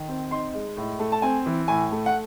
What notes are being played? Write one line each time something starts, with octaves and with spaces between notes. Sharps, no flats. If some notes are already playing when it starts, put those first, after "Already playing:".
Already playing: D#3
C4
D#4 C6
G#3
A2
A3
A5
C4 G#5
E3
A2 G#5
A3
F#5